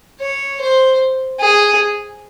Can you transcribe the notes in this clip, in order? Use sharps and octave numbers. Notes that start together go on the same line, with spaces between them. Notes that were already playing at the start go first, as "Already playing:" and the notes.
C#5
C5
G#4